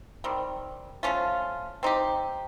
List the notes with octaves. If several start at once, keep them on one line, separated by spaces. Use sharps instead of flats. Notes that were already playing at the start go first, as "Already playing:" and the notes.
D#3 G3 C4
F3 A3 C#4 F4
C4 D#4 G4